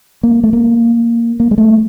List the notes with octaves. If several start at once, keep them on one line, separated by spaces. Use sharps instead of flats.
A#3
A3
A#3
A#3
G#3
A3